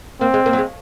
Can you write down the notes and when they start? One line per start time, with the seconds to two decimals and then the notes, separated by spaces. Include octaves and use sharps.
0.21 A#3 C4
0.34 G#3
0.46 A#3
0.53 F#3
0.58 G#3